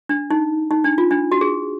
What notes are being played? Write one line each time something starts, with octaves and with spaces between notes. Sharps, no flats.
D4
D#4
D#4
D4
F4
D4
F#4
G#4